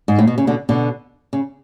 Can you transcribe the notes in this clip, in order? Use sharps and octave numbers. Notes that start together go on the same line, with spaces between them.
G#2
A2
B2
C#3
B2 D3
B2 D3
C#3